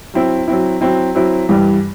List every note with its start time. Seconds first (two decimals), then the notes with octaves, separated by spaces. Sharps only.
0.14 F#3 C4 E4
0.48 F#3 C4 E4
0.81 F#3 C4 E4
1.15 F#3 C4 E4
1.49 G2 E3 G3